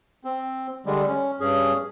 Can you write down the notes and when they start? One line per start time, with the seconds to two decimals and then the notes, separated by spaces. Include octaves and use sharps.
0.24 C4
0.86 D3 G3 G#3
1.08 C#4
1.40 G2 C#4 G#4